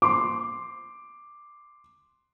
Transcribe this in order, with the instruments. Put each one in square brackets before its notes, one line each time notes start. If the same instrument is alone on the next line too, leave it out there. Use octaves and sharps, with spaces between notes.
[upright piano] C6 D6